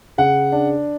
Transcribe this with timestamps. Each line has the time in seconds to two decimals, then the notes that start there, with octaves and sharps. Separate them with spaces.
0.18 C#3 F#5
0.52 D4